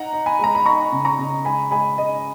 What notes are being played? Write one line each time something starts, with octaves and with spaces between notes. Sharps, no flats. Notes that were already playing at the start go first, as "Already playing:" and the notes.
Already playing: D#4 F#5 A#5
D#4
G#5 B5
G#3 A#5
B5
D#4 A#5 C#6
C#3
A#5 C#6
C#3
G#3 G#5 B5
G#3 G#5 B5
G#3 D#5